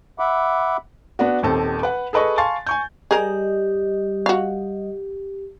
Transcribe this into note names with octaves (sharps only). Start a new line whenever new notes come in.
E5 F#5 B5 D6
B3 D4 F#4
D#1 D#2 C4 A4
B4 F#5
G#4 A4 B4 D#5 C#6
F5 G#5 A5 C6 C#6 A6
G#5 C#6 G6
G3 G4 G#4 A#4 D#5
F#4 F5